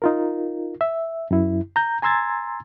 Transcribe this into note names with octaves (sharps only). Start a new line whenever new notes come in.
D#4 F4 A#4
E5
F#2 E4
A#5 G6
G#5 A#5 C6 E6 G#6 A6